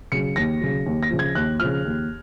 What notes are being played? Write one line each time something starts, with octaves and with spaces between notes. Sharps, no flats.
C#3 F#3 C#7
D#2 A#6
C#3 F#3
D#2
A#6
C#3 F3
G#6
D#2 F#6
C#3 F3 F6
D#2